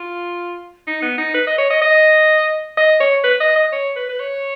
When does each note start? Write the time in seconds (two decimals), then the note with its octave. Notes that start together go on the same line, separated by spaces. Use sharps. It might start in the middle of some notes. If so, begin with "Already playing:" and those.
Already playing: F4
0.87 D#4
1.02 B3
1.18 D#4
1.34 B4
1.47 D#5
1.58 C#5
1.71 D#5
1.82 D#5
2.77 D#5
3.00 C#5
3.24 B4
3.41 D#5
3.56 D#5
3.73 C#5
3.96 B4
4.09 B4
4.20 C#5